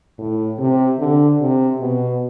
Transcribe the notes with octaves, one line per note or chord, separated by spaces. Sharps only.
A2
C3
D3
C3
B2